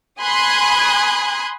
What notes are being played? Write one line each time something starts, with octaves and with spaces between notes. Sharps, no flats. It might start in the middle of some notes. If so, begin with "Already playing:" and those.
G#5 B5 C6 D#6 F#6 G#6